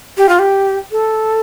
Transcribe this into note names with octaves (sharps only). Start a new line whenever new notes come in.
G4
F4
G4
A4